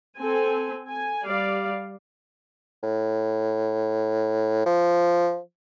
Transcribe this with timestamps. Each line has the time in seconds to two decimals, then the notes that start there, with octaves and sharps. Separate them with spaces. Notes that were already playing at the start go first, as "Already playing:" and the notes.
0.18 C4 A4 G#5
0.87 G#5
1.24 G3 D5 F5
2.83 A2
4.66 F3